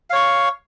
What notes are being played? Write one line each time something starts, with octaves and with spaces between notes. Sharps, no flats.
C#5 F5 C#6